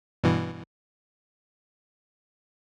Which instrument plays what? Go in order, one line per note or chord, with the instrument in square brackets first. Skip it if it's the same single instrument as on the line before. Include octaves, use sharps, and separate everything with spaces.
[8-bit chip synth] G2 B2 E3